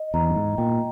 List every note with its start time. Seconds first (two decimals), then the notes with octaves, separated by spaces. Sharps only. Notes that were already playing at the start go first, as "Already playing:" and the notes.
Already playing: D#5
0.14 E2 A#5
0.30 G2
0.35 G#2
0.58 A#2 G5